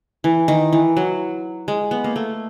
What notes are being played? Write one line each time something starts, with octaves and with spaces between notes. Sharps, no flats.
E3
D#3
E3
F#3
G#3
B3
A#3
A3